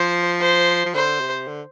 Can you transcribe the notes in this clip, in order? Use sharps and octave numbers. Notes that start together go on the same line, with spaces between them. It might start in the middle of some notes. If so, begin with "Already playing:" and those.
Already playing: F3 C5
C5
F3
D3 C5
C3
D3